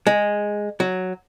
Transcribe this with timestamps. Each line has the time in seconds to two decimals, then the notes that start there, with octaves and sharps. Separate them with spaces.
0.07 G#3
0.80 F#3